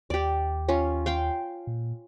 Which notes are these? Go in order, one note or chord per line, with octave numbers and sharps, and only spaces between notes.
D#2 G4 D5
C#4 F4
F5 G5 C6
A#2